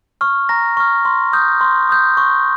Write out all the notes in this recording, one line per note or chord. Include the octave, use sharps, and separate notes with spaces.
C#6 F6
A#5 A#6
C#6 F6
C6
D#6 G6
C6
D#6 G6
C#6